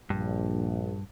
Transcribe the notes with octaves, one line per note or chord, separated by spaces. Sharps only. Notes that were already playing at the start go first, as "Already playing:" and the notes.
A#1 G2